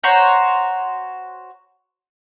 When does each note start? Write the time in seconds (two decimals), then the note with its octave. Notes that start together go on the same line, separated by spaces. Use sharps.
0.03 F#4 C5 C#5 A#5